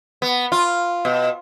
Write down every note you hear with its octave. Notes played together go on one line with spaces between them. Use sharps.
B3
F4
B2